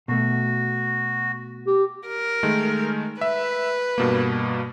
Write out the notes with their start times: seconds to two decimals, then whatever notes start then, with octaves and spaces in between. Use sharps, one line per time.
0.08 B2 A3 F#4
1.67 G4
2.08 A#4
2.43 D#3 G#3 A3
3.21 B4 E5
3.98 G2 B2 A#3